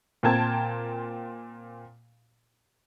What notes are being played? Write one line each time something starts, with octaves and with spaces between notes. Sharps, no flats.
A#2 C4 A#4 G5 A5 G#6